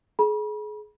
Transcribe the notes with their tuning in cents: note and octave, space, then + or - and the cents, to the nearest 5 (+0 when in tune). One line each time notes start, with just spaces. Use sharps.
G#4 +30 B5 -40